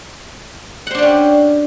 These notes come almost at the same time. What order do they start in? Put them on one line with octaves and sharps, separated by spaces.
F#5 C5 D4 G4 C#4